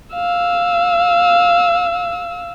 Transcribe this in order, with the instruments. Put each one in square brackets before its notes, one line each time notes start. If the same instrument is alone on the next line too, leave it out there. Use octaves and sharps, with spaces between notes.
[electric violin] F5 E6